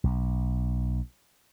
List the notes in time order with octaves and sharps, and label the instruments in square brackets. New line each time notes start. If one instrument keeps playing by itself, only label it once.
[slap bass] B1